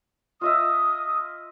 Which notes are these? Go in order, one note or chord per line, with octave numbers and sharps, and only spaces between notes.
F4 D#5 E5 D#6